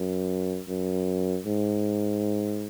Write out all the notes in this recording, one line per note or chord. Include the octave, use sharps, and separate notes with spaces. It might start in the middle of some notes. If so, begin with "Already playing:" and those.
Already playing: F#2
F#2
G#2